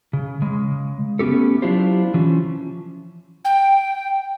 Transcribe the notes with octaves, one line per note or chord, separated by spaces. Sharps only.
C#3
C#3 G#3
A3 B3 C#4 G4 A4
F#3 D4 E4 F4 G4 C5
E3 F3 C#4
G5